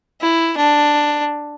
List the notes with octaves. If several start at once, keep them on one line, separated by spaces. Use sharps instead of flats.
E4
D4